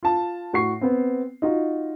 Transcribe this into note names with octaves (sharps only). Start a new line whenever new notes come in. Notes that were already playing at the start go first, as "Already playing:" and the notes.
F4 A5
A2 F#4 C#6 C7
B3 C4
D#4 F4 F#4